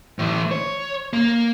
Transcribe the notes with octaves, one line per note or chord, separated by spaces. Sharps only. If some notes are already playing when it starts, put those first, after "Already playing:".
A2 E3
C#5
A#3